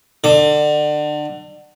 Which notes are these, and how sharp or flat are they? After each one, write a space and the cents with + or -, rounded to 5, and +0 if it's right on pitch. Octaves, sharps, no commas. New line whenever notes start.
D3 +30 D6 +10